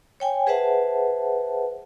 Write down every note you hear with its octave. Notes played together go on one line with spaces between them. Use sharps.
C#5 G5 G#5
G#4 B4 C5 E5 F#5 A5